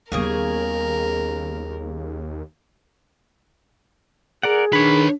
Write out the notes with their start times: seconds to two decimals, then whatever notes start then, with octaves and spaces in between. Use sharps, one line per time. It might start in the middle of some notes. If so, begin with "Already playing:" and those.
0.12 D#2 C#3 G3 A#3 B3 G#4 A#4
4.43 G#4 A#4 D5 F#5
4.73 D#3 D4 B4 C#5 B5